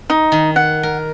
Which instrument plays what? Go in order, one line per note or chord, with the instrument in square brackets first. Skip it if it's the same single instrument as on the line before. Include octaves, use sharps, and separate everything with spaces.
[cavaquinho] D#4
[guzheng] D#3
[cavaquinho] F#5
[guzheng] A#4